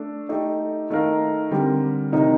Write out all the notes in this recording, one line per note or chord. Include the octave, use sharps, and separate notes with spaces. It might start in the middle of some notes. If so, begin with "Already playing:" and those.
Already playing: A3 D4 A4
A3 D#4 G4
D#3 A3 D#4 A#4 F5
D3 G3 C4 G4 A#4
C3 D#3 A3 D#4 A#4